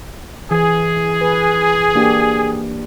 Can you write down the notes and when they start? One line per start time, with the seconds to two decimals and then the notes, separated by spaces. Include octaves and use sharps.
0.51 E3 G#4
1.21 B4
1.95 A#3 D4 G4